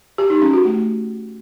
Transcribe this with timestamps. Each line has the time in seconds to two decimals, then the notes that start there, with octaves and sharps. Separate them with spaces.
0.18 G4
0.30 D#4
0.42 C#4
0.53 F#4
0.65 A3